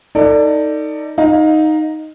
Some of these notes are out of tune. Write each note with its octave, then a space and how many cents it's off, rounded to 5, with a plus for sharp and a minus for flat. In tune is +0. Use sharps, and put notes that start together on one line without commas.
D#4 +5 A4 +30 D5 +0
D#4 +0 F5 +25